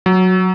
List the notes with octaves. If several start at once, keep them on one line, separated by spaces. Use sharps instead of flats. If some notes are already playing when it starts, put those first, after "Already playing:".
F#3